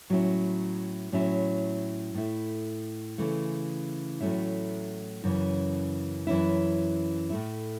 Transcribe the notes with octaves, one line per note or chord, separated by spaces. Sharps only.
A2 F#3 C#4 E4
A2 F#3 C#4 E4
A2 A3 E4
C#3 E3 A3
A2 F#3 A3 C#4 E4
F#2 C#3 E3 C#4
F#2 E3 C#4 E4
A2 A3 E4